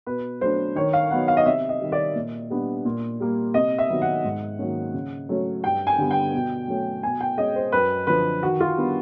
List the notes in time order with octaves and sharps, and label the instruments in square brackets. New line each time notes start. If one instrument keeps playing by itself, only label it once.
[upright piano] B2 B4
F#3 A3 D4 C5
D#3 C#5
F5
F#3 B3 D#4 F#5
F5
D#5
C3 E5
D#5
D#3 G3
D5
A#2
G3 B3 D4
A#2
G3 A#3
C3 D#5
E5
D#3 F#3 B3
F#5
G#2
D#3 F#3 A#3 C#4
C#3
F#3 A3 C#4
G2 G5
G#5
D3 G3 B3
G5
B2
F#3 A3 C#4
B2 G#5
G5
G#3 C#4 D#5
C5
F#2 B4
D3 F3 B4
D#3 F#4
F4
G3 B3 D4